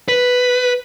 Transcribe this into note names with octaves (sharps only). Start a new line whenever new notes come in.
B4